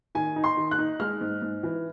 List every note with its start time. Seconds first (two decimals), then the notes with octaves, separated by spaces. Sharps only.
0.15 D#3 G#5
0.36 D#4
0.44 C6
0.57 D#3
0.71 F#6
0.78 D#4
1.00 G#3 F6
1.21 G#2
1.42 G#2
1.63 E3